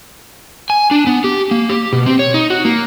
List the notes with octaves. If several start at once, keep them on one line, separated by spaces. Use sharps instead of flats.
G#5
D4
B3
G4
A#3
G4
B2
C4
C#5
D#4
F#4
A#3